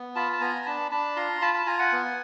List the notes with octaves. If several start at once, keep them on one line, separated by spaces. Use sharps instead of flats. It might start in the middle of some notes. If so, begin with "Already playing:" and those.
Already playing: B3
F4 A5 B5
A5
B3 G#5 A#5
A#5
D4 A5 B5
D4 A5 B5
F4 A#5 C6
F4 A5 B5
A5 B5
F4 G#5 A#5
F#5 G#5
B3